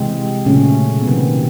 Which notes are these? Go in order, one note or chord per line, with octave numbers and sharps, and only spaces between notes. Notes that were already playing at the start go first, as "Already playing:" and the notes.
Already playing: C3 E3 G#3 C4
A#2 C#3 F#3 A3 C#4
B3
C3 D#3 F#3 A#3 C4